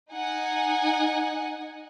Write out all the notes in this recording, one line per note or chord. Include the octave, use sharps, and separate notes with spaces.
D#4 F#5 G#5